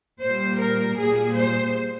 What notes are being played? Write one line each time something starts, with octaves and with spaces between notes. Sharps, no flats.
A#2 G3 C5
A#4
A#2 G3 G#4
C5